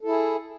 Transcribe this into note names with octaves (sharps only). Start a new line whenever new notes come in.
E4 G#4 A4